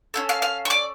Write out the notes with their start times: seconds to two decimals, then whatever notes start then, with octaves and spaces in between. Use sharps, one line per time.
0.14 C#4 E4 A4
0.29 F5 F6
0.42 F5 F6
0.65 C#6
0.70 D5 D6